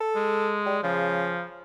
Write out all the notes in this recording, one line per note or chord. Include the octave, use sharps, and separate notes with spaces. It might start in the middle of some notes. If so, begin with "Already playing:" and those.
A4
G#3
G3
C#3 F3